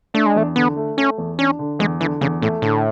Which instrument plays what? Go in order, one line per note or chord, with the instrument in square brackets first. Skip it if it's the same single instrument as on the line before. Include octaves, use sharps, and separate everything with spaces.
[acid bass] A3 [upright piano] D4
[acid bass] G#3
[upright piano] E2 [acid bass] A3
[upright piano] D3 [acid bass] B3
[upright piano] A3
[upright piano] A3 [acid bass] C#4
[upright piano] E2
[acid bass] C#4 [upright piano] D4
[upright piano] D3
[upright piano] E2 [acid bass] G#3
[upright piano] D3 [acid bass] E3
[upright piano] E2 [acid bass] C#3
[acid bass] A2 [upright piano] A3
[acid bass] A2 [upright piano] D3